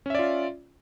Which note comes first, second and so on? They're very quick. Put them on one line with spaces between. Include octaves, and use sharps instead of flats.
C#4 E5 D5 F4